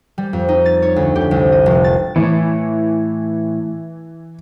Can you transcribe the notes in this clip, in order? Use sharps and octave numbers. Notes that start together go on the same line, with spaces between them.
G3
F2
D#4
A6
C#5
D2
G4
C2
D#5
F1
A6
A2 E3